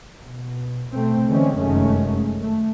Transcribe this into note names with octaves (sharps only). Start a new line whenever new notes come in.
B2
B2 A3 C4
D3 E3 G#3 C4 C#4
F1 F#2 D#3 G#3 A3 C#4
A3